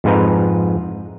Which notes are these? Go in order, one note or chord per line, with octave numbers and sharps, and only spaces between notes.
F2 G#2 F4 B4 A#5